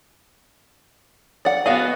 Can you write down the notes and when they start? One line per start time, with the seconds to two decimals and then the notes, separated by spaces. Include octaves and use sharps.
1.45 D5 F#5
1.66 B3 F#4 G#4 D#5 F5